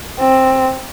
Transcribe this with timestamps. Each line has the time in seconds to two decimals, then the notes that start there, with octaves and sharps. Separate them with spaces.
0.20 C4